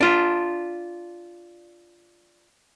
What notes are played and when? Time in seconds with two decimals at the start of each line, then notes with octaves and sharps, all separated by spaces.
0.01 D4 F4